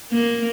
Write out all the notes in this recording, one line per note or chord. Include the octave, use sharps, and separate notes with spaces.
A#3